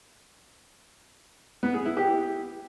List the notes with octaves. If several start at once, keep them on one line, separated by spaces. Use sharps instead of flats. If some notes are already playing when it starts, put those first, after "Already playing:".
B3
G#4
E4
G4